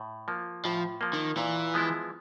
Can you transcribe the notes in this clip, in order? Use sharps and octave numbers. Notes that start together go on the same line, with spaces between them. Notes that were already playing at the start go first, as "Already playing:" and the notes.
Already playing: A2
F3 A#3
A2 F3
F3 A#3
D#3
A#2 E3
F3 G#3 B3 E4